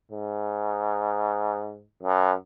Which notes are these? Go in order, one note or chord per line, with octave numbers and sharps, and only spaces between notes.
G#2
F#2